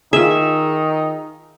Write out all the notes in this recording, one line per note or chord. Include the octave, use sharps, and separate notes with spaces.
D#3 D#4 F4 G#4 E5